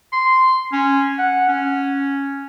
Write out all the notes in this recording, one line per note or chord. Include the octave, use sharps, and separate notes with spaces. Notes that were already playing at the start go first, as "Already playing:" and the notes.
C6
C#4
F#5
C#4